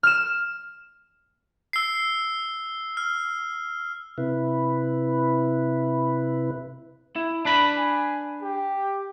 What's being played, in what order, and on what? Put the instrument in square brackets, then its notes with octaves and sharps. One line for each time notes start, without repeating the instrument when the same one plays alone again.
[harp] F6 E7
[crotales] E6 C7
F6
[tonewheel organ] C3 E4 B4
[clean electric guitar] E4
D4 B4 B5
[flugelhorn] G#5
G4